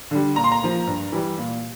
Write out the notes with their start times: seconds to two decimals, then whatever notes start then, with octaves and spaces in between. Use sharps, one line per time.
0.11 D3 G3
0.36 A#2 A#5
0.44 C6
0.52 A#5
0.62 F3 A#3
0.87 G2
1.12 E3 G3
1.38 A#2